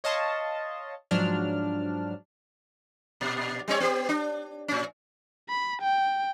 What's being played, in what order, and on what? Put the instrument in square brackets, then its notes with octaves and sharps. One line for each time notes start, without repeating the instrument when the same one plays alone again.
[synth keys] C#5 D#5 F5 A5 C6 C#6
G#2 F3 F#3 D4 F6
[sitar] A#2
G3 C4 C#5
B3 G4
D4
A2 C#4
[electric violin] B5
G5